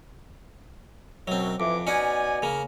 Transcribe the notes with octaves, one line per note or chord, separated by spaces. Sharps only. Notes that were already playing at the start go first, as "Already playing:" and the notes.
F#2 B2 F#3 C4
F2 E3 D6
B2 C#4 D#4 D5 F#5 G#5
C#3 A#3